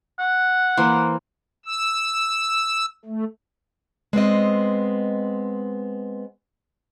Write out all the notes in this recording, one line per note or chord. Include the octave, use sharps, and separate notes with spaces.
F#5
E3 A#3 C5
E6
A3
G#3 B3 C4 D#5